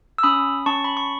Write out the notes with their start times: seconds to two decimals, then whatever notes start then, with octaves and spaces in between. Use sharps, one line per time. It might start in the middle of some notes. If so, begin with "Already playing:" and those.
0.18 E6
0.23 C#4 B5 D#6
0.66 C#4 A5 C#6
0.84 B5
0.97 C#6